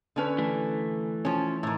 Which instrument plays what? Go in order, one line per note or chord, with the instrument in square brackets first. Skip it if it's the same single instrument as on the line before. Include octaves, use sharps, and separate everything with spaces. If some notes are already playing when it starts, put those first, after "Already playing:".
[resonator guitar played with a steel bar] D3 C#4 B4
[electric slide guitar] E3 A3
[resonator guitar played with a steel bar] F3 C#4
A2 D#3